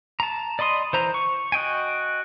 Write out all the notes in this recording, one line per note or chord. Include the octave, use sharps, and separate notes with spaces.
A5 A#5
D5 D#5 B5 C6 D#6
E3 C5 A#5
C#6
F#4 D#5 G5 G#5